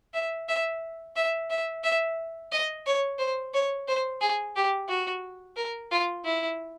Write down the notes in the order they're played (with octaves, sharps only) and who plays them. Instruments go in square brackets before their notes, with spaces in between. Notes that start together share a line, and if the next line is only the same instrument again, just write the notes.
[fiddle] E5
E5
E5
E5
E5
D#5
C#5
C5
C#5
C5
G#4
G4
F#4
A#4
F4
E4